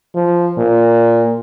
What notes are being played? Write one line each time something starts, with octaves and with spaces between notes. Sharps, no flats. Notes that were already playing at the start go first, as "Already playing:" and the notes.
F3
A#2